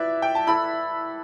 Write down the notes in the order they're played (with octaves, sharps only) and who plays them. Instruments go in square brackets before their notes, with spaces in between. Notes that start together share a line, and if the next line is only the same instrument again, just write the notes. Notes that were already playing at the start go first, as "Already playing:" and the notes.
Already playing: [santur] E4 B4 D5 [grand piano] E5
[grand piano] G5
A5
[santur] E4 A4 E5 [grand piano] B5